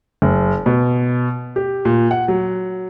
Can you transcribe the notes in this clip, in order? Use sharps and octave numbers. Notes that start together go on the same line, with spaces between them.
F#1
B2
G4
A#2
F#5
F#3